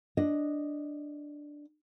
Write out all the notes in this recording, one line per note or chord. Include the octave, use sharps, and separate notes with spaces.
D4 D#5